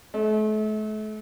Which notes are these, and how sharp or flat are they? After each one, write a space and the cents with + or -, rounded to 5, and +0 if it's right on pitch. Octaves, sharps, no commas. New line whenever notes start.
A3 -40